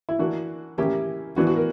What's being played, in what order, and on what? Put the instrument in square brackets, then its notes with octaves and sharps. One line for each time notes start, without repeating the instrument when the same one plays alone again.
[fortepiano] E4
E3 A#3 D4 F#4
E3 A#3 C#4 E4 G4
E3 B3 D4 F#4
F#4
A#4